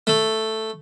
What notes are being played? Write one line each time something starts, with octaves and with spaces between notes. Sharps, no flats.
A3